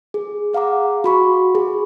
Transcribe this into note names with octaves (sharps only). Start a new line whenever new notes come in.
G#4
G#4 F5 F#5 A#5 D6
F#4 B5 C#6
G#4